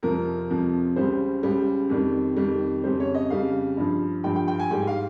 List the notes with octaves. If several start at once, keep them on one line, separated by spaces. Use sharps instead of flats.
F2 C3 F3 A#4
F2 C3 F3
C#2 C#3 G3 C5
C#2 C#3 G3
F2 D#3 G3
F2 D#3 G3
F2 C#3 G3 C5
C#5
D#5
F2 C#3 G3 F5
G2 F3
G2 F3 G5
G5
G5
G#5
G#2 G3 G5
F5